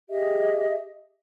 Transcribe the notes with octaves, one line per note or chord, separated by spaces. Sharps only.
G4 G#4 D#5 E5